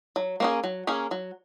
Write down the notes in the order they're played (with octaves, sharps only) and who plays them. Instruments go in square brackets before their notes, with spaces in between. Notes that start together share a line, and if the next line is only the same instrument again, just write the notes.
[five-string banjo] F#3
A#3 C#4 G#4
F#3
A#3 C#4 G#4
F#3